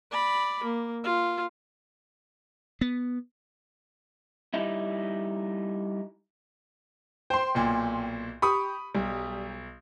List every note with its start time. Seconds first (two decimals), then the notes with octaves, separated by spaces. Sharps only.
0.11 D5 B5
0.63 A#3
1.04 F4
2.81 B3
4.54 G3 D#4 E4
7.30 C5 G5 C6
7.55 B1 A#2
8.42 G4 B5 C#6 D#6
8.94 B1 G3